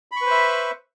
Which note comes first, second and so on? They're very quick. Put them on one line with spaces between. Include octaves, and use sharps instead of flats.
B5 C#6 B4 C5 E5